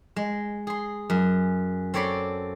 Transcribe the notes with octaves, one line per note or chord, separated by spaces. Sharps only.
G#3
G#4 C6
F#2
C4 A4 C#5 D5 B5 C6